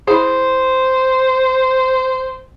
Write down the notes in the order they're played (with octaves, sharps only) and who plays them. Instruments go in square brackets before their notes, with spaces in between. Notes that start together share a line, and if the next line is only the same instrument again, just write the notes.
[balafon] E4 G#4 [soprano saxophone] C5